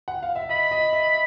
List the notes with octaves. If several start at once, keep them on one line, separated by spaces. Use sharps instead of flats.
F#5
F5
E5
D#5 B5
D#5
E5